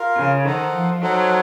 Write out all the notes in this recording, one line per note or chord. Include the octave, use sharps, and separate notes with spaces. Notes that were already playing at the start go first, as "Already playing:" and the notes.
Already playing: F4 A#4 F5
C#3
D#3 D#4 A4 C5 F#5
F3
F#3 D#4 A4 C5 F#5